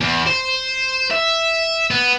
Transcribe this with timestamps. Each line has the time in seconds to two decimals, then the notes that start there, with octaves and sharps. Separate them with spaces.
0.01 E2
0.27 C5
1.11 E5
1.91 B3